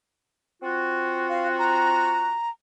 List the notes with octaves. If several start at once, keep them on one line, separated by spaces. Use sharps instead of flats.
C4 F4 F#4
F5
A#5